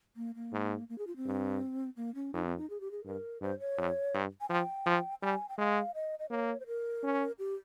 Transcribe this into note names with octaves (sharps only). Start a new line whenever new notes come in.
A#3
A#3
G#2
A#3
G#4
F4
C4
G2
A#3
C#4
F2 D#4
C4
D#4
G#4
G4
G#4
G2 A#4
G2 C5
C#5
F2
G2
G#5
F3 G5
F3
G3 G#5
G5
G#3 F5
D#5
D#5
A#3 C#5
C5
A#4
C#4
G4